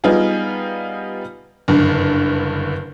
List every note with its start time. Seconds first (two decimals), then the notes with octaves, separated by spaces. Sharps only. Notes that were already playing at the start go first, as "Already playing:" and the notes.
0.04 G3 B3 D#4 F4 G#4
1.68 F#1 G2 D3